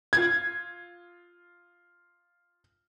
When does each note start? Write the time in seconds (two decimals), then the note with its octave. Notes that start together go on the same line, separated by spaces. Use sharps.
0.13 F4 G#6